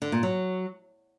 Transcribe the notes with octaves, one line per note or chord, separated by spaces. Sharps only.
D3
A#2
F#3